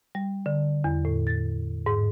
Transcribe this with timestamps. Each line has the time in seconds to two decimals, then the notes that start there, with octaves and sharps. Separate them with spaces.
0.15 G3
0.46 D3
0.84 E2
1.05 A2
1.27 A6
1.86 G#2